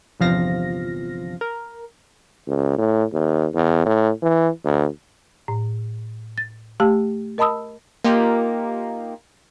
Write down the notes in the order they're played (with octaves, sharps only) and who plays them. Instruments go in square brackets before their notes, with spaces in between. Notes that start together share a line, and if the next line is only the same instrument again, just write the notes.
[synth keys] G1 E2 C3 F3 F5 A#6
A#4
[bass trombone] C#2
A2
D#2
E2
A2
E3
D2
[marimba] A2
A6
A3 G4 F5 A5 E6
A#4 D#5 A5 B5 D#6 E6
[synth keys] A#3 D#4 F4 G4